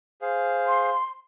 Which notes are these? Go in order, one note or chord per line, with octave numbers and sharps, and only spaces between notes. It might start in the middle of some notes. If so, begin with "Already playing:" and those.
G#4 C5 F5
C6